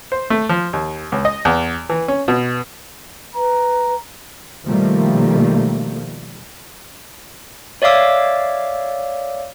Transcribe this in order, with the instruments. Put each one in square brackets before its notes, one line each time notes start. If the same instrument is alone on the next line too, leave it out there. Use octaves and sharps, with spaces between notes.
[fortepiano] C5
A3
F3
D#2
C#2
D#5
E2
E3
C#4
B2
[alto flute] B4 [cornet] A#5
[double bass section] B2 D#3 F3 G3 A3 A#3
[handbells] C#5 D5 E5 F5 D6 E6